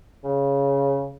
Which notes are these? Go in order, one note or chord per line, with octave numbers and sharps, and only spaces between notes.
C#3